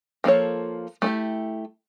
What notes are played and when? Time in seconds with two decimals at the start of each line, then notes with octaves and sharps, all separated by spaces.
0.24 F3 A#3 E4 A4 C#5
1.02 A3 E4 G4